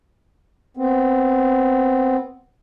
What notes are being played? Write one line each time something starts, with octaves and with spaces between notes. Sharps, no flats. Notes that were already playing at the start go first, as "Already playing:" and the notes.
B3 C4